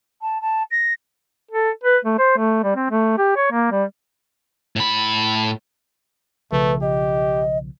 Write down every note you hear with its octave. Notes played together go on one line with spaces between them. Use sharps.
A5
A5
A#6
A4
B4
A3
C5
A3
G3
C4
A3
G4
C#5
A#3
G3
A2 B5
B1 C#3 F3 A3 B4
G4 D#5